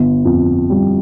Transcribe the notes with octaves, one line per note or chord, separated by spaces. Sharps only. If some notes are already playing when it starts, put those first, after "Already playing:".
Already playing: G1
F2
G3